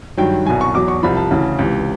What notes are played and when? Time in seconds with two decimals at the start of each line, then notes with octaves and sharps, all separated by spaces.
0.17 G2 D#3 F#3 G5
0.46 C2 B2 F#3 G#5
0.61 C#6
0.74 E2 B2 F#3 D6
0.88 C#6
1.03 C2 C3 F3 B5
1.17 A5
1.31 D2 C#3 E3
1.59 C#2 C3 E3